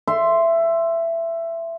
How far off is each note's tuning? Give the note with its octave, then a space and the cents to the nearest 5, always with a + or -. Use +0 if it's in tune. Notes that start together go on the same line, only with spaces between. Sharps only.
E5 +15 C6 +0